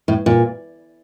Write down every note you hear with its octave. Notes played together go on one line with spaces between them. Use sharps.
A2
A#2